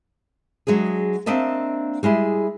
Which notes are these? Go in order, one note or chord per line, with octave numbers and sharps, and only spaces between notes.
F#3 G#3 D4 G#4
A#3 C4 D4 D#5 E5 A5
G3 G#3 E4 G#4